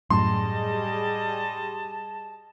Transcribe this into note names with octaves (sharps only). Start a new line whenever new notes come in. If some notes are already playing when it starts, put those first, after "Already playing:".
F#2 A2 G3 G#4 D#5 A5 C6